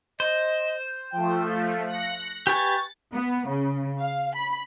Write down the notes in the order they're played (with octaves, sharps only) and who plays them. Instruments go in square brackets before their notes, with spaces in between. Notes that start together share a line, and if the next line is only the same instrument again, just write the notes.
[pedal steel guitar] C5 [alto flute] D#5
[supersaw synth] F3 A3 [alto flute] G5
[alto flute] F5
[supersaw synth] F#6 A#6 C#7
[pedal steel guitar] G4 B4 G#5 [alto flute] C#6 [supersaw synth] A6
[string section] B3
C#3
F5
B5